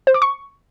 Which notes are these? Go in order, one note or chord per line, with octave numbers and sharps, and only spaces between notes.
C5
D6
C#6